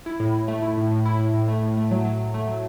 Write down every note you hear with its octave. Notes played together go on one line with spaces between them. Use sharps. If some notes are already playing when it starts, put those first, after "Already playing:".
E4
A2
A2
A3
E4
A2
A2
E4
A2
A2
A3
A2
A3
F#3
F#3
F#3
A3
F#3